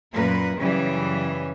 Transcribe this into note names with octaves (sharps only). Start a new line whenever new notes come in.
F#2 A#2 A#4 B4
F#2 C#3 E3 G3